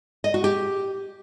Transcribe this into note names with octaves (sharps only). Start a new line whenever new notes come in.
D#5
F#4
G4